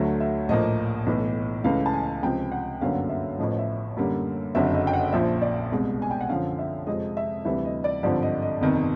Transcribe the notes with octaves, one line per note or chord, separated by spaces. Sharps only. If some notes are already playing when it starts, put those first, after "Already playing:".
Already playing: D2 D3 F#3 A3 E5
E5
A#1 A2 F3 A#3 D#5
B1 A2 E3
C#2 C#3 E3 A3 F5
A5
G#5
C#2 C3 F3 G5
F#5
G1 F#2 D3 F#3 A#3 F5
E5
A1 A2 F3 D#5
E5
F#2 D3 G3 A#3
F#1 F2 D3 F#3 E5
D#5
G5
F#5
A#1 A#2 F3 E5
D5
C2 B2 G#3
G#5
G5
F#5
F#2 D3 F3 F5
E5
F2 C3 F3 G#3 D#5
E5
D2 C3 E3 G3 E5
D#5
D5
G#1 G2 D3 F3 D5
D#5
D#5
G1 F2 C3 D#3